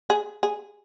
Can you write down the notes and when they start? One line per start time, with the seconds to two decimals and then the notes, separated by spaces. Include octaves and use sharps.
0.10 G#4
0.43 G#4